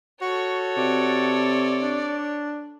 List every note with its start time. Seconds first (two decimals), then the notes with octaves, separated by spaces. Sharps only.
0.22 F#4 A4 C#5 C#6
0.77 C3 D5
1.82 D4